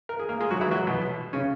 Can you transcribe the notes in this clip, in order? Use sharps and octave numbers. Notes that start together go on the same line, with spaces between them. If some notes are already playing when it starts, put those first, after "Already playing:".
A#4
G#4
A#3 A#4
G#3 G#4
F#3 F#4
E3 E4
F#3 F#4
B2 B3
C#3 C#4